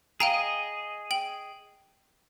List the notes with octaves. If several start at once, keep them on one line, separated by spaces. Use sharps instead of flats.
G#4 D#5 F5 G5 A#5
G5 F#7